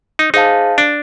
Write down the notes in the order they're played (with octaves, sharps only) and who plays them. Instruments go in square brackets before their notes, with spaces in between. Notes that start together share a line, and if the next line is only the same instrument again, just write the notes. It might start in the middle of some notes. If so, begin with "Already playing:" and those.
[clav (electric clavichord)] D#4
[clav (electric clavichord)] D#4 [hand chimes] G#4 C5 F5 A5
[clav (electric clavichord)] D4